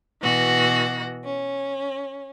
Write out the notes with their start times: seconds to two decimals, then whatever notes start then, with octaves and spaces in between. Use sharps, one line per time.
0.21 B2 E3 F#4 A#6
1.24 C#4